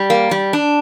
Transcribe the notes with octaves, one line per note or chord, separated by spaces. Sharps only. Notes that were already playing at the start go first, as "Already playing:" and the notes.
Already playing: G3
A#3
G3
D4